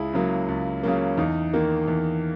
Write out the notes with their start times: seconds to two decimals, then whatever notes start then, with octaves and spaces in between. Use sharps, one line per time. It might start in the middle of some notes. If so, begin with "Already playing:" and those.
Already playing: C#2 E4 G#4
0.13 C#3 F#3 A#3
0.49 C#2
0.83 C#3 F#3 A#3
1.17 E2 D#4
1.53 D#3 A#3
1.88 E2